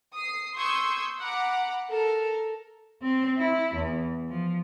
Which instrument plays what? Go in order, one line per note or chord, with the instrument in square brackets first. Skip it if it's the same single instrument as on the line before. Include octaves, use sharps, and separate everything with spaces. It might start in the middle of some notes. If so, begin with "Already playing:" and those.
[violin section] D#6 C7
C6 C#6 D#6 E6 G6 G#6
F#5 A#5 B5 D6
A4 A#4
[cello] C4
E4
E2
F3